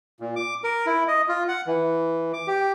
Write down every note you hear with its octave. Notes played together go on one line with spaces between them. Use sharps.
A#2
D6
A#4
E4
D#5
F4
F#5
E3
D6
G4